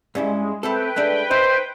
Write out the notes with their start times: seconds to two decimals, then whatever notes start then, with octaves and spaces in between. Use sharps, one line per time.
0.15 G2 G#3 C#4 E4
0.63 A3 C4 A4 B4 G5
0.96 G#3 A3 D4
1.31 D#4 C5 E5